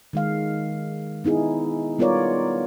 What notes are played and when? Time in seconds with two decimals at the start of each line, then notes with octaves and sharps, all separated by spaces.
0.13 D#3 G#3 F5
1.24 B3 D#4 E4 G#4
1.98 G3 B3 F4 A#4 C#5 D5